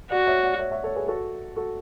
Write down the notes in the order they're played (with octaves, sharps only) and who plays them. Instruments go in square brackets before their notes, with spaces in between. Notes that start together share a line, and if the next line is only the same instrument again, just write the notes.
[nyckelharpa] F#4 [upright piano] D5 F#5
[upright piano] C#5 E5
D5 F#5
C#5 E5
C#5 E5
A4 C#5
G#4 B4
F#4 A4
F#4 A4